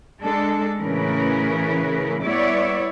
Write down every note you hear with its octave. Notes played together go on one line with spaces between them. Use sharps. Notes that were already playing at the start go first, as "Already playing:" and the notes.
G#3 D4 A4
A2 C#3 E3 A#4 B4
G3 B3 E4 C#5 D5 E5